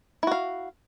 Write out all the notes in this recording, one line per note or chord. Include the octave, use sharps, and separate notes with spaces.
E4 F#4 F5